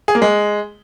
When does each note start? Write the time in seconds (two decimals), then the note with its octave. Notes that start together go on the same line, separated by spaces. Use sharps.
0.08 G#4
0.15 A#3
0.22 G#3